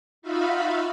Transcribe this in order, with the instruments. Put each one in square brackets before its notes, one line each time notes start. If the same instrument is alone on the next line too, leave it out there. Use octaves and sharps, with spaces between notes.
[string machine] D#4 F4 F#4 E5 F5 B5